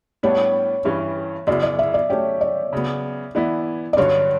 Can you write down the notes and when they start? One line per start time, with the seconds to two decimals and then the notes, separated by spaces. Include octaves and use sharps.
0.23 A2 G3 B3 D4 C#5
0.85 G2 E3 G3 C#4 E5
1.47 F#2 C#3 F#3 B3 E4 D5
1.63 D5
1.79 E5
1.94 D5
2.10 F#3 A3 C#4 G4 C#5
2.41 D5
2.73 C#3 F#3 B3
3.35 E3 B3 E4 D5
3.93 D5
3.97 G2 D3 F#3 C#4 C#5